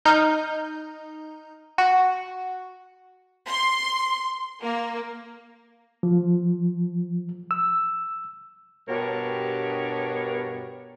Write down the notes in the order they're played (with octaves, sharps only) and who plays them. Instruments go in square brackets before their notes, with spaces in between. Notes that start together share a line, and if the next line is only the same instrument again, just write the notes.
[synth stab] D#4 F6 G6
F#4
[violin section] C6
A#3
[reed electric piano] F3
E6
[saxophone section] G2 B2 D4 G4 A#4 C#5